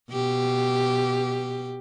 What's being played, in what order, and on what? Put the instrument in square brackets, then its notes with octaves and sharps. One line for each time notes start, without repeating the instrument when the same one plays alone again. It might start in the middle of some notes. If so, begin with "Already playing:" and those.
[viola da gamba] B2 G4